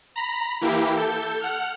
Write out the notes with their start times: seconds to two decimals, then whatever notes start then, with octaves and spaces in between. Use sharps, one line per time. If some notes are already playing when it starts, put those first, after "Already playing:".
0.16 A#5 B5
0.61 E3 A#3 E4 G4
0.97 A4 G6
1.40 F#5 F6